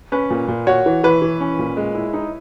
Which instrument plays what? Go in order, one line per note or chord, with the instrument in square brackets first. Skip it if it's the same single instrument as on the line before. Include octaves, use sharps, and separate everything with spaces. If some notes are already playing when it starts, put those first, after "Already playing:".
[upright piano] C#4 [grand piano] B4
[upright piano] A#2
A#2
[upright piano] F#4 [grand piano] C#5
[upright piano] E3
[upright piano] E3 [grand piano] B4
[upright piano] E3
C#4
A#2
G#3
E4
D#4